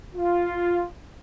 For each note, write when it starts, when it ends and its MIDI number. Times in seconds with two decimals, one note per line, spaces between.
0.15 0.85 65